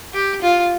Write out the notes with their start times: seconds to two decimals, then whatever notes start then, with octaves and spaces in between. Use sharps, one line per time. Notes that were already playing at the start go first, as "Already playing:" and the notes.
0.14 G4
0.42 F4